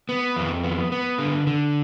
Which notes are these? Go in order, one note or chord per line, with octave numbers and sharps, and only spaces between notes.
B3
F2
B3
B3
D3
D3